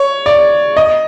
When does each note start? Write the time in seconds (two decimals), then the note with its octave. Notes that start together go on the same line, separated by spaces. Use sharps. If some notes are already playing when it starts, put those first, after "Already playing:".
Already playing: C#5
0.26 D5
0.77 D#5